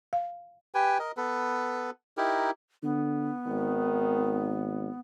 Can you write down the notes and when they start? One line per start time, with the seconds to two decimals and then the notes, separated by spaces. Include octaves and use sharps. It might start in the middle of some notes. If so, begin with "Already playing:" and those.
0.13 F5
0.75 G4 B4 G5 G#5
0.99 A#4 D#5
1.17 B3 A4 B4
2.17 D#4 E4 G4 A#4
2.83 D3 B3
3.47 G#1 D#3